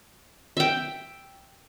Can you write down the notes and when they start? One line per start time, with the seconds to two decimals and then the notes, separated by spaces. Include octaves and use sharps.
0.57 E5 G5